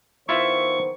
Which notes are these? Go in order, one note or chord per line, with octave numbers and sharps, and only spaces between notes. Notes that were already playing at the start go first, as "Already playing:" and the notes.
D#3 B3 E4 F4 C5 E5 C#6